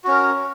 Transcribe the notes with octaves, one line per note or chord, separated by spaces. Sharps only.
C#4 F#4 A#4